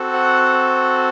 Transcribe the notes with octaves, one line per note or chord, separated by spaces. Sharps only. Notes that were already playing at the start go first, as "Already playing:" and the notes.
Already playing: C4 F#4 A4
F#5